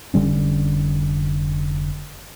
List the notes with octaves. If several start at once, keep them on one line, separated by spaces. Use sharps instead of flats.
F1 D3 G3 C#4